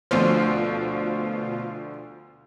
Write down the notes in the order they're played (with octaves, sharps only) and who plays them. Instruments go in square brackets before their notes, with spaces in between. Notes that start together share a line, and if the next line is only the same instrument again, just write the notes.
[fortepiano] D2 F3 [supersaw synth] B2 F4